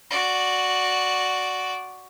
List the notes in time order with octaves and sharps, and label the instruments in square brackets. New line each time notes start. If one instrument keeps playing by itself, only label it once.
[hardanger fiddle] F#4 D5